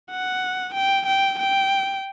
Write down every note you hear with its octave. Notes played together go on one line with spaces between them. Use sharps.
F#5
G5
G5
G5